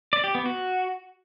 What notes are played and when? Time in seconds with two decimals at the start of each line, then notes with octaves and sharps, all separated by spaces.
0.13 D5
0.24 G4
0.35 B3
0.46 F#4